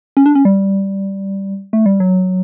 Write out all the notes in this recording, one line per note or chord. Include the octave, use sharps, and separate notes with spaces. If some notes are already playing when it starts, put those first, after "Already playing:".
C#4
D4
C#4
G3
A3
G3
F#3